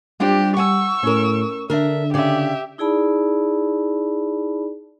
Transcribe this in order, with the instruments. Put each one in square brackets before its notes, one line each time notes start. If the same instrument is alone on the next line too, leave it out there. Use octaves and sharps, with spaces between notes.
[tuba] G3 [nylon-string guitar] C4 D4 F4 [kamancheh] G4
[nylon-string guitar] F#5 G#5 [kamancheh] C#6 E6
[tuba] A2 [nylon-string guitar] C#4 A#4
[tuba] D3 [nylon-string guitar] D4 A#4 [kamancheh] E5
[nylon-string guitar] C#3 D5 [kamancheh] G4 E5
[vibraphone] D#4 E4 G#4 D5 A5 B5